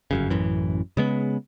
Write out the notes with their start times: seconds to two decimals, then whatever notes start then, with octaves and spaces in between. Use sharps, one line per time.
0.11 G1 F#2 C#3
0.30 A1 F#2 E3
0.97 C#3 G#3 B3